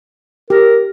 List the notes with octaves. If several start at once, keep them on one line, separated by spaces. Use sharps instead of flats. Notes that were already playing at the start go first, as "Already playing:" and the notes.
G4 A#4